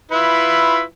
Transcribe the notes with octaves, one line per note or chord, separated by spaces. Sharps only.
E4 F4 B4